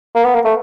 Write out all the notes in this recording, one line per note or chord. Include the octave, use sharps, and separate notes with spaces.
A#3
B3
A#3
A3